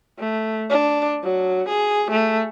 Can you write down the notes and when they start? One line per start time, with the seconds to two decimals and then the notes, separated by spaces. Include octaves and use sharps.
0.19 A3
0.70 D4
1.23 F#3
1.68 G#4
2.11 A3